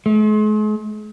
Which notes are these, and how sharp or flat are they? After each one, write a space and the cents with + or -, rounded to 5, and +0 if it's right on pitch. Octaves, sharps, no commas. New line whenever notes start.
G#3 +45